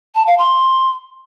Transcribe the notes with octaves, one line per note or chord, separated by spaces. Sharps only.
A5
F5
C6